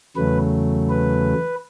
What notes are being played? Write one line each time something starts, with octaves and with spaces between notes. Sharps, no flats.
E2 C#3 F#3 A3 B4
B4